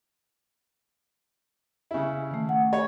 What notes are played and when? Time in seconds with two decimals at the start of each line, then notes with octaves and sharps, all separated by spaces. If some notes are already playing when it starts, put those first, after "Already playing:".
1.91 C#3 E4
2.31 D#3 A3
2.49 F#5
2.73 C#5